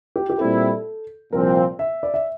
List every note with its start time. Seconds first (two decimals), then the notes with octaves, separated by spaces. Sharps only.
0.16 G4
0.30 G4
0.38 A#2 G3 C4 E4 A4
1.32 C2 A#2 F3 C4 A#4
1.79 E5
2.03 D5
2.14 E5